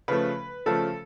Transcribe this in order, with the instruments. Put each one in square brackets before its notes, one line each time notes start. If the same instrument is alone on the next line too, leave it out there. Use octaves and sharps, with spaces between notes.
[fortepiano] C#3 F3 A3 B4
C#3 F3 A3 A4